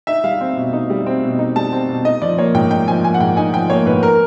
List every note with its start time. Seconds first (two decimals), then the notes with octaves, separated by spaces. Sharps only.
0.07 D#4 E5
0.24 G3 F5
0.41 C4
0.57 B2
0.73 D#4
0.90 G3
1.06 C4
1.23 B2
1.39 D#4
1.56 G3 A5
1.73 C4
1.89 B2
2.05 D#4 D#5
2.22 F3 D5
2.38 A#3 C#5
2.54 G#2 G5
2.71 D#4 G5
2.88 F3 G#5
3.04 A#3 G#5
3.14 F#5
3.20 G#2 G5
3.37 D#4 G#5
3.54 F3 G5
3.70 A#3 C#5
3.86 G#2 B4
4.03 A#4